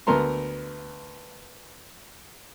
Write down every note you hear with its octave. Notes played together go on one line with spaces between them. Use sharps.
D2 B3 A#4 A#5 C6